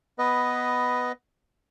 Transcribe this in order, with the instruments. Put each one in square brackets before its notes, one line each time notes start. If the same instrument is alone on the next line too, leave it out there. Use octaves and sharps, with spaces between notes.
[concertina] B3 B4 D#5